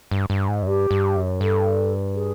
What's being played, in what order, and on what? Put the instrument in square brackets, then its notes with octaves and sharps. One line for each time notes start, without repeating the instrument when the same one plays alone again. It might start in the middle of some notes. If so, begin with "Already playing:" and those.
[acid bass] G2
G2
G#2
F#2
[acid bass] G2 [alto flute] G4
[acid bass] G2
F#2
[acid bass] G2 [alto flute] A4
[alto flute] G#4